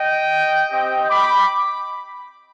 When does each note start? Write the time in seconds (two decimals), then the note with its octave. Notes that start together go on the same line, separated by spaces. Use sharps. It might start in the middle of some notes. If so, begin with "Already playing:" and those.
Already playing: D#5 G5
0.71 C4 G4 D#5 G5
1.10 B5 D6